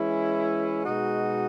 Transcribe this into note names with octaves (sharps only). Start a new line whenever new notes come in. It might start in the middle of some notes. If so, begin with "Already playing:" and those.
Already playing: E3 G#3 C#4 E4
B2 G#3 D#4 F#4